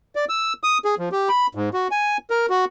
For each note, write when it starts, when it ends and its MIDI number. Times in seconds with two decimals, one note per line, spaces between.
0.15 0.25 74
0.29 0.53 88
0.63 0.78 87
0.85 0.95 68
0.99 1.09 53
1.12 1.29 67
1.29 1.47 83
1.55 1.69 44
1.74 1.88 66
1.91 2.17 80
2.30 2.46 70
2.50 2.65 66